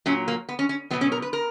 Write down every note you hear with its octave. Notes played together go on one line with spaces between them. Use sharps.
A#2 F#3 C#4
A#3
B3
C#4
C#4
B2 F#3 B3
C#4
A#4
B4
A#4